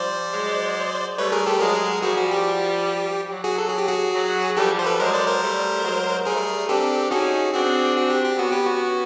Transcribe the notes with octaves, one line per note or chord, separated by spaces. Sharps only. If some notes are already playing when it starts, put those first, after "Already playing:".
Already playing: F3 G3 C5 D5
F#3 G#3
G3 A3 B4 C#5
G#4 A#4
G4 A4
F#3 G#3 G#4 A#4
F3 G3 F#4 G#4
F#4
G4
F#3
F#4 G#4
A4
G#4
G4
F#4 G#4
F#3
F3 G3 G4 A4
C5
A4 B4
F#3 G#3 A#4 C5
C5 D5
A#4 C5
G3 A3
F#3 G#3
G3 A3 G#4 A#4
C4 D4 G4 A4
C#4 D#4 F#4 G#4
C4 D4 F#4 G#4
F#4
G4
G4
B3 C#4 F#4
G4
F#4